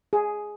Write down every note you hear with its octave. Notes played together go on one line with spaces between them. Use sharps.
G#4